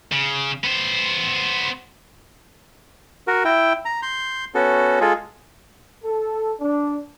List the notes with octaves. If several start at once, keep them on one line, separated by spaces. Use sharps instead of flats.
C#3
B3 C5
F#4 A#4
E4 G5
A#5
C6 G6
B3 C#4 F#4 A4
G#3 F4 G#4 A4
A4
D4